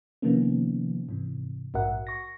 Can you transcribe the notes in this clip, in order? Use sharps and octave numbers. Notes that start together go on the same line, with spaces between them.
C3 D#3 F3 A#3 B3 C#4
G#2 C3 E3
A#1 G#2 F#4 A#4 E5 F#5
C#6 A#6